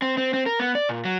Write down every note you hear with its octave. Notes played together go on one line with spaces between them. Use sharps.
C4
C4
C4
A#4
B3
D5
A#2
F#3